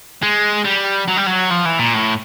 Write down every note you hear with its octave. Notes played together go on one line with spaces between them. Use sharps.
G#3
G3
F#3
G3
F#3
F3
E3
A#2
A2